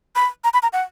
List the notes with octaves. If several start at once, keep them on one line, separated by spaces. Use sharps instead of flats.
B5
A#5
B5
A#5
F#5